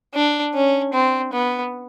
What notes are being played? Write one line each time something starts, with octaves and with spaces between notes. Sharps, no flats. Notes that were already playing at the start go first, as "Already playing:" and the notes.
D4
C#4
C4
B3